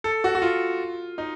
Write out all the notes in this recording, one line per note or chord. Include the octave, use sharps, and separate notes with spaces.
A4
F#4
F#4
F4
D#4